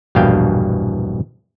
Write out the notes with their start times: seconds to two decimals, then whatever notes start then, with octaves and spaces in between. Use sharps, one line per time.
0.15 A#1 E2 G2 B2 F5 G5